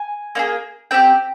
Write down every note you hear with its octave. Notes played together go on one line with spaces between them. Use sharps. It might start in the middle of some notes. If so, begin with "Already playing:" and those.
Already playing: G#5
A#3 D#4 G#4
C4 G4 G5